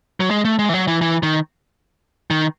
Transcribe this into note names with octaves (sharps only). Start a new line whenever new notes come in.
F#3
G#3
A3
G#3
E3
F#3
E3
E3
D#3
D#3